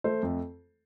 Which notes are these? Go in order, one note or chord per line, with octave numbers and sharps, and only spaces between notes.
A3 A4 C5
F2